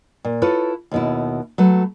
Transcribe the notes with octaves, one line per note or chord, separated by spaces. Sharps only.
A#2
E4 F4 A4 B4 C#5
D#2 B2 E4
F#3 A3 B4